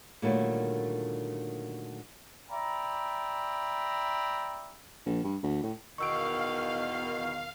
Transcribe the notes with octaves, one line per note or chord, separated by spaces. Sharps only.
A#2 D3 D#3 F#3 G3 A3
D5 E5 G5 A#5 B5
A#1
G2
D2
A2
E2 B2 D#3 F5 C#6 E6 D7